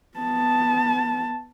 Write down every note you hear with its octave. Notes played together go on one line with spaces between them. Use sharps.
B3 A5